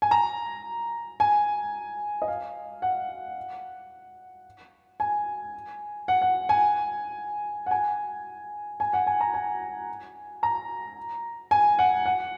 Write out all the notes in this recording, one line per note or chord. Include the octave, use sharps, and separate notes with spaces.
G#5
A#5
G#5
D#5
F5
F#5
G#5
F#5
F#5
G#5
F#5
G#5
G#5
F#5
G#5
A#5
G#5
A#5
G#5
F#5
F#5